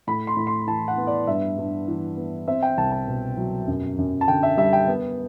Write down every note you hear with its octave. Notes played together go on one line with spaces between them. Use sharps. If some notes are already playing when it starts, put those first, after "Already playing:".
A2 B5
C6
A2
C6
E3 A5
F#5
B3
D5
G2 E5
G2
E3
B3
C4 E5
G5
C2 A5
A5
B2
F#3
F#2
F#2
A5
D3 G5
E5
G3 E5
G5
B3